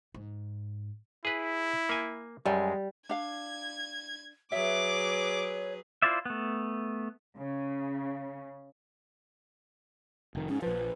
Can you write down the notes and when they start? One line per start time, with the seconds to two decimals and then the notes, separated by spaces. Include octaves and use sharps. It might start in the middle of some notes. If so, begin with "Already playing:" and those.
0.14 G#2
1.25 E4 G#4 B4
1.89 A#3 G#5
2.46 F#2 G3 G#3
3.09 D4 F5 G#6
4.52 F#3 G#4 B4 C#5 E5 D6
6.02 E4 F4 C5 D5 E5
6.25 A3 B3
7.37 C#3
10.35 F1 D#3
10.49 G#2 C#4
10.62 A#1 F3 B4